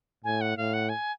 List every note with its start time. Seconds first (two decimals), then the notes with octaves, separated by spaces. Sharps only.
0.24 A2 G#5
0.41 F#5
0.57 A2 F5
0.74 F#5
0.89 G#5